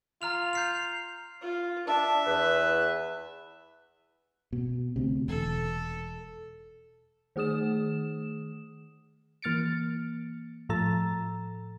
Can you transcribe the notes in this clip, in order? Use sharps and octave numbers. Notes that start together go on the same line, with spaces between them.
F4 A#5 F6 F7
G6 C7 F7
F4
D4 E5
E2 B4
B2
D2 C3
E1 A4
D#3 A3 G#4 D#6 E7
E3 A#3 F6 A6 C#7 D7
A2 F3 A4 A#5 E6 A6